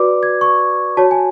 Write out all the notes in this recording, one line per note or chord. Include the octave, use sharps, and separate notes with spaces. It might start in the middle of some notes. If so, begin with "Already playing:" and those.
Already playing: F#4 B4 D5 D6
G#6
C#6
F#4 C#5 A5
G#5